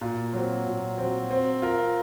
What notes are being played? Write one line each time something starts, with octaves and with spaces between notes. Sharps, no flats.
A#2
F#3 C4
A#2
F#3 C4
C4
F4 A#4